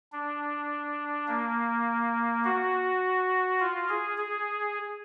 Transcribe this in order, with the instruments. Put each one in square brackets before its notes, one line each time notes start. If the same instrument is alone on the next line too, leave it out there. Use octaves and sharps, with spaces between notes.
[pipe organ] D4
A#3
F#4
F4
G#4
G#4